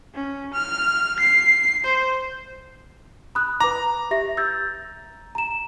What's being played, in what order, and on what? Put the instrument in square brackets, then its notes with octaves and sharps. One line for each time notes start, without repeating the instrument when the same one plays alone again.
[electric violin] C#4
F6
C7
C5
[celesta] B5 D#6 F#6
[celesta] B4 D6 [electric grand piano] A#5
[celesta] G4 E5 A#6
E6 G6 A6
A#5 E7